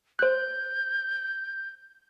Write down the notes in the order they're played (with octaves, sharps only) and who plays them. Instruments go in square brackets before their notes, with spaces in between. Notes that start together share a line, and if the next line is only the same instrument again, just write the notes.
[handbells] C5 F#6 [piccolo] G6